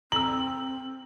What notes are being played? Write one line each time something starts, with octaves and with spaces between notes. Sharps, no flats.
C4 A#5 E6 F#7